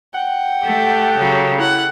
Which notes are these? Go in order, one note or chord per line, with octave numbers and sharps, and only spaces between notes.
F#5 G5
A3 G4 A4
C#3 F#3
E4 F#5